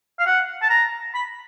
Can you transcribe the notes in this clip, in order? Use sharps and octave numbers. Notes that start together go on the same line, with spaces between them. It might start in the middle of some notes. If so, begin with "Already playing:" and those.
F5
F#5
A5
A#5
B5